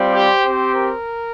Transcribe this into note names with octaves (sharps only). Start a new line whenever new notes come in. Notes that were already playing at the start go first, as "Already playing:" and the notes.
Already playing: G3 C4 F4
G4 C5
C4 G4
A#4